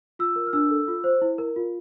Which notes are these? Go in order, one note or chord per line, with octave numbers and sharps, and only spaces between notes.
F4 E6
A#4
F6
D4 E6
A4
F4
C5
E4
A#4
F4